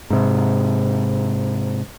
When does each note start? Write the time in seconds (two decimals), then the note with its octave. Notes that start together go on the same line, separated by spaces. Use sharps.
0.10 G#2 C3